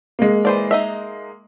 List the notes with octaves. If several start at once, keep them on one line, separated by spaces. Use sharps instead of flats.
G#3 A#3
E3 C5 D5
D#4 D#5 E5